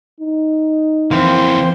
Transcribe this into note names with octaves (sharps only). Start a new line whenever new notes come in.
D#4
F2 E3 A#3 C4 C6